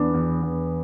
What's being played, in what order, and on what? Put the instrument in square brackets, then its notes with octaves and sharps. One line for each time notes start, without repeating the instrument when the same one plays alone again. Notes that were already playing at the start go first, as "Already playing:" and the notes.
Already playing: [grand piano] E2 B3 [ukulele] D4
[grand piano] E2
E2